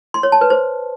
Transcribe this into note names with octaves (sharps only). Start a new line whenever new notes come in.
C6
C#5
A5
B4
C5